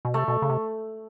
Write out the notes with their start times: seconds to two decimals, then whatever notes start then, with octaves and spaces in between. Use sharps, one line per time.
0.05 B2
0.14 C3 A3
0.28 B2
0.42 C#3
0.49 C3